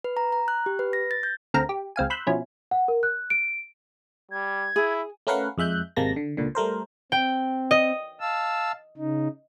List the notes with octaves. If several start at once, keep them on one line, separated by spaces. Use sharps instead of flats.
B4
A#5
A#5
F#6
G4
B4
A#6
A6
G6
D2 D3 C4 A#4 F5 A#5
G4
C#2 C4 F5 G#5
B5 C6 E6 F#6 G6
B2 F3 C#4 E4
F#5
A#4
F#6
D7
G3 G#6
E4 G#4
A3 C#4 A#4 B4 F5 F#5
F2 G#3 E5 F#6 G6
G#1 C3 G#3 A#3 A5 A#6
D3
C#2 A#2 D3
G3 A3 A#4 C5
C4 G5
D#5
F5 A5 E6
C#3 D#4